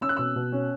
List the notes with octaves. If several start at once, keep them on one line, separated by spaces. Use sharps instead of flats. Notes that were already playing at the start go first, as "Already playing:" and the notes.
C#4 E6
F#6
B2 E6
B2
C#4